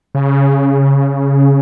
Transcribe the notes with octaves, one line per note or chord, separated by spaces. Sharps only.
C#3